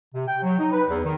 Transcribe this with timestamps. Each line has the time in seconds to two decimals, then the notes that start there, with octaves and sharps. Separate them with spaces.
0.15 C3
0.28 G5
0.42 F#3
0.59 D#4
0.72 B4
0.89 E2
1.04 D#3